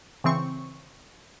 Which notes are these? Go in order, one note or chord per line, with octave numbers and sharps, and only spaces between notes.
C#3 E3 C4 C#6